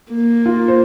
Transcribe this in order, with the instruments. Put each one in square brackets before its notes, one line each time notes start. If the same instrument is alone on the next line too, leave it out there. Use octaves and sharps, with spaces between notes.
[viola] A#3
[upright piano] F4
C5